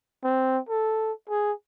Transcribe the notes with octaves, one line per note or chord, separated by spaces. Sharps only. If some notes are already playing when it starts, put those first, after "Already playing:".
C4
A4
G#4